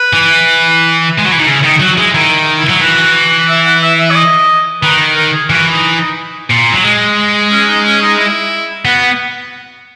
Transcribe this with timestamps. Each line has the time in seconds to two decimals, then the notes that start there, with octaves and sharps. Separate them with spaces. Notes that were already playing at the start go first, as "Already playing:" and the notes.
Already playing: B4
0.13 E3
1.19 G#3
1.26 F#3
1.32 E3
1.39 D#3
1.47 C#3 E4
1.64 D#3 D#4
1.80 F#3 F#4
1.97 G#3 E4
2.14 D#3 E4
2.59 E4
2.70 F#3
2.81 E3 F#4
3.48 E5
3.65 F#5
3.82 E5
3.99 E5
4.10 C#5
4.15 D#5
4.83 D#3 B4
5.16 A#4
5.33 G#4
5.50 E3 F#4
5.72 D#4
5.95 D#4
6.51 A#2
6.73 F#3
6.84 G#3
7.51 C#4
7.68 D#4
7.85 C#4
8.02 D#4
8.19 E4
8.85 B3 F#4